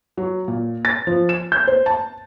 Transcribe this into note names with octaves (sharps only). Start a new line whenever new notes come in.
F#3
A#2
A6
F3
E7
G6
C5
A5